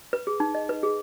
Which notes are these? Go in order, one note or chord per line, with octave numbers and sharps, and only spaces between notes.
B4
G#4
D#4
D#5
B4
G#4